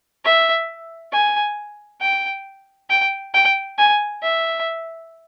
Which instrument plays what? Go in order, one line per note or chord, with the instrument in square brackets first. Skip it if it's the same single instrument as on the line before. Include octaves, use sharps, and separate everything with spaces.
[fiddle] E5
G#5
G5
G5
G5
G#5
E5